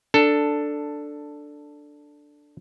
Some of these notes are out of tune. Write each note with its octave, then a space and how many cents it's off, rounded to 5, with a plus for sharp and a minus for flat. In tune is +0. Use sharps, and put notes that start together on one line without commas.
D4 +0 A4 +10